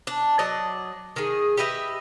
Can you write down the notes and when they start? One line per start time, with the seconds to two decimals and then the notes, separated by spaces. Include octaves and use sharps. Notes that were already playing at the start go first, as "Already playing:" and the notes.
0.07 D4
0.39 F#3 D5 D#5
1.16 D#3 G#4
1.57 G4 B4 D#5 E5